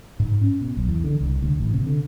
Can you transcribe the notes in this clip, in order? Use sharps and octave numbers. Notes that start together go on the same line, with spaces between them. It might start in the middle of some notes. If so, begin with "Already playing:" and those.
G#2
C#4
B2
B1
E2
D3
C2
D2
A1
C3
D3